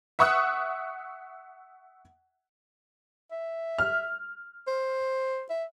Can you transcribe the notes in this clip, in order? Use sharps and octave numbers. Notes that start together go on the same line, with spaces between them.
E5 F#5 C#6 D#6 E6 F#6
E5
F6
C5
E5